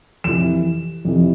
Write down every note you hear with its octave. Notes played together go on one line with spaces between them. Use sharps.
F2 C3 E3 E7
F2 C3 E3